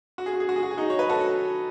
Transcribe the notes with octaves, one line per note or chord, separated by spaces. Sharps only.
F#4
G#4
F#4
G#4
F#4
G#4
F#4
G#4
D#4 F#4
C#5
B4
F#4 A4